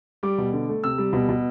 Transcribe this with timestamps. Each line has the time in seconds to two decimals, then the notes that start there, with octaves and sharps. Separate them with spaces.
0.23 G3 D6
0.38 B2
0.53 D3
0.69 A3
0.84 C3 E6
0.98 G3
1.13 B2
1.29 B2